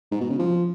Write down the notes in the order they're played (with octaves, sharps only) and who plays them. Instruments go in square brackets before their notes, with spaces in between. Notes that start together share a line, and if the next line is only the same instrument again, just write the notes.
[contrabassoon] G#2
B2
C#3
F3